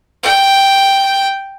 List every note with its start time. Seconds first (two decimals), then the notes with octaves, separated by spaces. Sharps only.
0.23 G5